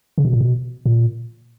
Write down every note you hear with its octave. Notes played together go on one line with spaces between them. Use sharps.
C#3
B2
A#2
B2
A#2